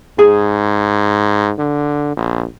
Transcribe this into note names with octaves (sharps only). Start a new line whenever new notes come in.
G#2 G#4
D3
A#1